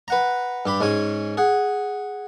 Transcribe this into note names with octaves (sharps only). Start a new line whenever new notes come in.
B4 F#5 A#5
G2 G4 B5
G#2 G#3 C#4 G#5
G#4 F#5